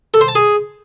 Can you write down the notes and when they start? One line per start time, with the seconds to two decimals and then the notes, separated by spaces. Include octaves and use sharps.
0.14 A4
0.21 C5
0.28 A5
0.35 G#4